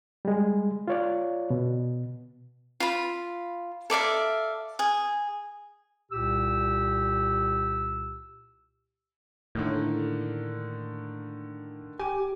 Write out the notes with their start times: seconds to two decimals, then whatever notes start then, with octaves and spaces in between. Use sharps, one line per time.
0.25 G3 G#3
0.88 F4 C#5 D5
1.50 B2
2.80 F4 B5
3.90 A4 D5 E5 F5
4.79 G#4
6.12 C2 A#2 G4 E6
9.55 A2 D3 D#3 A#3
11.99 G4 G#5 D6